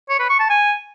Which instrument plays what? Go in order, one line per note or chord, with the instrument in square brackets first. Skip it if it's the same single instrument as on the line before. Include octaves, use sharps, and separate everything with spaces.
[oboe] C#5
B4
C#6
A5
G#5